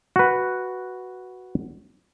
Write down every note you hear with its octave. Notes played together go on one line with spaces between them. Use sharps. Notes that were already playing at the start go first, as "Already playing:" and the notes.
F#4 B4